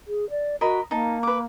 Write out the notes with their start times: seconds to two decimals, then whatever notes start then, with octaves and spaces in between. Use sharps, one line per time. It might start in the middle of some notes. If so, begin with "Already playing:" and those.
0.07 G#4
0.30 D5
0.61 F#4 A#4 D#5 B5
0.91 A#3 D#4 A5
1.23 B4 D6